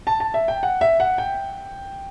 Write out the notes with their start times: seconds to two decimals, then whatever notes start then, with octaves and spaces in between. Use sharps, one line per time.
0.07 A5
0.20 A5
0.34 E5
0.48 G5
0.63 F#5
0.81 E5
1.00 F#5
1.18 G5